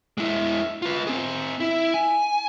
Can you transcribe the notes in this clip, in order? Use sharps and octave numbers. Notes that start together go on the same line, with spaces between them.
G#3 E4
F4 B4
C4 G#4
E4
G#5